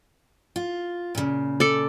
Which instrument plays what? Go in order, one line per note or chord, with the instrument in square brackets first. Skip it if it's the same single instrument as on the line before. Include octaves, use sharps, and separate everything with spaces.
[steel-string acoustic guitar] F4
A#2 C#3
[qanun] A4 D5